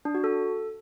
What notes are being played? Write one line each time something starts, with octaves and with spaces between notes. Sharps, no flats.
D4
F#4
A4